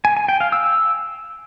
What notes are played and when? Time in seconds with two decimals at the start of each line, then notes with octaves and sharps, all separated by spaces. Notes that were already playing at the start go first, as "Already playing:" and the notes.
0.05 G#5
0.17 G#5
0.29 G5
0.40 F5
0.52 E6